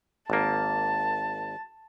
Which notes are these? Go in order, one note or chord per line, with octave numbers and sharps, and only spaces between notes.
G#1 A#3 A5